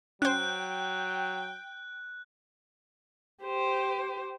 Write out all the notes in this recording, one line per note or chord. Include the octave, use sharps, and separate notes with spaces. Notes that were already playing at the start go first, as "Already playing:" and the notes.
F#3 C#4 C5 G5 F#6
G4 C5